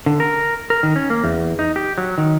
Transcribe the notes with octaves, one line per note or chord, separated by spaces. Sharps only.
D3
A#4
A#4
D#3
C#4
A#3
E2
D#4
G4
F#3
D#3